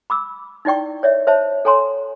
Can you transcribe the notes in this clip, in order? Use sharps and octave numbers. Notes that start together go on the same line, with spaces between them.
B5 D6 E6
D#4 E4 D5 G5 C#6
C#5 D5 E5
C5 C#5 E5 A5
A4 C#5 G#5 A#5 C6